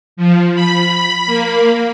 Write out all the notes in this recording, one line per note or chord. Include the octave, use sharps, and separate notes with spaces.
F3
B5
A#3